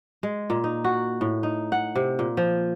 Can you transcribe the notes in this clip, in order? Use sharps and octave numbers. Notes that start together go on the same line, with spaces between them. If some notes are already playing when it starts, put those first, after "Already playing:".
G#3
A#2
D#4
F#4
A2
D#4
F#5
C3
A#2
F3